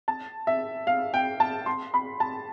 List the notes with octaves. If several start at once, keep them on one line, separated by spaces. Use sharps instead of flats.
A5
E5
F5
G5
A5
C6
B5
A5